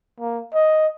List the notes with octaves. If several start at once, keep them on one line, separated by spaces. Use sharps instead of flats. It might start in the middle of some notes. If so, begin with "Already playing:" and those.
A#3
D#5